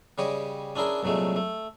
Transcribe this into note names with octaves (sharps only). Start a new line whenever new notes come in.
C#3 G3 G4 C#5 D#5
C#4 D4 E4 G#4 A#4
C2 A#2 F#3 G#3 A3
A3